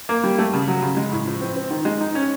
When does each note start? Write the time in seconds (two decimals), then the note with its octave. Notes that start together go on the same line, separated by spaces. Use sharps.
0.09 A#3
0.24 G3
0.39 A3
0.53 C#3
0.68 F#3
0.83 C#3
0.97 G#3
1.12 A2
1.26 F3
1.41 C4
1.56 C4
1.70 D#3
1.85 G#3
2.01 D#4
2.15 C#4